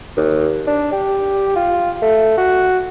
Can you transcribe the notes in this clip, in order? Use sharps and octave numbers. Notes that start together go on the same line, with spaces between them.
D#2
D4
G4
F4
A3
F#4